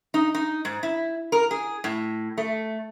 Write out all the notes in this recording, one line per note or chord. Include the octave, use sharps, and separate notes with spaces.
D#4
D#4
G#2
E4
A#4
G#4
A2
A3